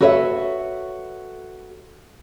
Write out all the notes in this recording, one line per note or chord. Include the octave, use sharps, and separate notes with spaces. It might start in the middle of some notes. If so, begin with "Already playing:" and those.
F#4 A4 B4 C#5 D#5 E5